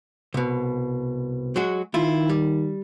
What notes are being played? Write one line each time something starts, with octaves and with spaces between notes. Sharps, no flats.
C2 B2
F#3 G#3 F#4
D#3 E4 F4
G3